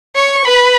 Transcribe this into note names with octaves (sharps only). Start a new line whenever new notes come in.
C#5 C#6
B4 B5